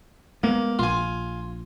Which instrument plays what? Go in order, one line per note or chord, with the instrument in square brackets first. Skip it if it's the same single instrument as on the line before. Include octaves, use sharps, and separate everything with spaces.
[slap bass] G#3 B3 [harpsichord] A#3
[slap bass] A#1 [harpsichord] F4 G#5